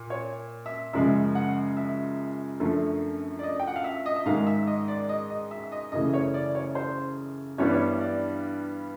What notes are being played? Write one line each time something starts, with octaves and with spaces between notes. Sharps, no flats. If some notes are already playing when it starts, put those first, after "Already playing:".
Already playing: A#2
C#5
E5
F#2 C#3 F3 G#3 E5
F#5
E5
F#2 D3 F3 A3
D5
D#5
G5
F#5
F5
E5
D#5
E5
G#2 D#3 G#3 F5
E5
D#5
D5
D#5
D#5
E5
D#5
F#2 C#3 E3 A3 D#5
C#5
D5
C#5
C5
G2 E3 G3 B3 C#5
D5
C#5
D5